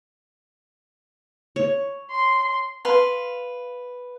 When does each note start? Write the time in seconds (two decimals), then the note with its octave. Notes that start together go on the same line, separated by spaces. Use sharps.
1.56 C#5
2.11 C6
2.85 B4 F5 C6